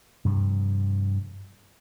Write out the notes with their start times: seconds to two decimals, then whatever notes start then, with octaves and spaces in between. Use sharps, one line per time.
0.25 G2 C3 F3